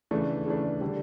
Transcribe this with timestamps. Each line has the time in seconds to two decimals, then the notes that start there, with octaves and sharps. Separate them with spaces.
0.11 C#3 E3 A3 D4
0.46 C#3 E3 A3 D4
0.81 D3 G3